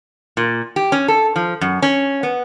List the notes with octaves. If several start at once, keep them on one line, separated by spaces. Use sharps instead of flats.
A#2
G4
C#4
A4
F3
F#2
C#4
B3